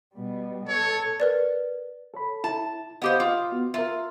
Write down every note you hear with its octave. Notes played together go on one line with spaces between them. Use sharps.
B2 G3
A4 C#5
A#4 B4 D5
A4 C#5 B5
E4 A5
B3 G4 C5 D#5 F5 D#6
F4
B3 F#4
F4 A#4 E5